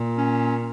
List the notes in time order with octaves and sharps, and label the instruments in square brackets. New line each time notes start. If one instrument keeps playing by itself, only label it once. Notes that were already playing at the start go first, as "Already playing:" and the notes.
Already playing: [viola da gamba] A#2
[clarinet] C#4